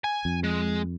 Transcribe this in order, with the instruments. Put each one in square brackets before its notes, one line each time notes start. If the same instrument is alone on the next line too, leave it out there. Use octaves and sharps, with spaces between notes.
[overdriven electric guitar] G#5
[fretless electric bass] F2
[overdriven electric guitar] G#3